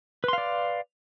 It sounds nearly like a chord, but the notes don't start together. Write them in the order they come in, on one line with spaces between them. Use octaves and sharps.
B4 C6 F5 D5